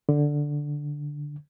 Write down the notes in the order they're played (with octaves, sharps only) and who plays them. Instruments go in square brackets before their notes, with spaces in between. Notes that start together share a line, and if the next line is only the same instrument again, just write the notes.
[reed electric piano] D3